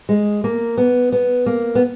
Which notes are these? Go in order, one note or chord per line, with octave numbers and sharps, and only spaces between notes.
G#3
A#3
B3
B3
A#3
B3